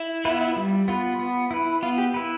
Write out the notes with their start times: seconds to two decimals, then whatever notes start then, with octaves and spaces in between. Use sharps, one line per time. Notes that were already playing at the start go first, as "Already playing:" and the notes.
Already playing: E4
0.25 B3 F4 B4
0.56 G3
0.88 B3 F4 B4
1.19 B3
1.51 E4 B4
1.83 B3 F4
1.98 G4
2.14 E4 B4